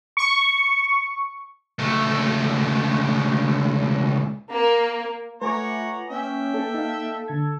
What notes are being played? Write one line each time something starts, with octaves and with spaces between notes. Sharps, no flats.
C#6
C#2 A3
A#3
A3 F4 B4 C#5 F#5 G#5 A#5 D6
A#3 C#4 E5 G5
A4
D#4 F5
D3 A4 G#6